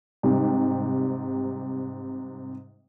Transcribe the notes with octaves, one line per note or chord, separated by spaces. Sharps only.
G#2 C3 G3